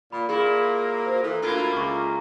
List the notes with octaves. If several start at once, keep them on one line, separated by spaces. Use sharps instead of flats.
A#2 B5
A#2 A#3 E4 G#4 B5
F#4 C5
E3 A4
D2 A#3 E4 F4
C#2 C#6 D6